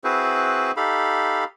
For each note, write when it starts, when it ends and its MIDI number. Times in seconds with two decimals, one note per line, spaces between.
0.04 0.72 60
0.04 0.72 64
0.04 0.72 66
0.04 0.72 68
0.04 0.72 71
0.04 0.72 72
0.77 1.44 63
0.77 1.44 67
0.77 1.44 69
0.77 1.44 77
0.77 1.44 83